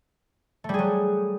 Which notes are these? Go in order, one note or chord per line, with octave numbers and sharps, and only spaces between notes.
F#3 G3 A3 G#4